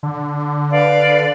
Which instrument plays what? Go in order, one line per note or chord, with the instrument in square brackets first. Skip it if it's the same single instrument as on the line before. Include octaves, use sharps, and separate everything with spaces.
[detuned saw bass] D3
[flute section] B4 D5 F5